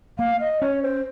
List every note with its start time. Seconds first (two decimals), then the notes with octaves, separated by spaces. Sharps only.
0.18 A#3 F5
0.40 D#5
0.61 C#4 C#5
0.83 C5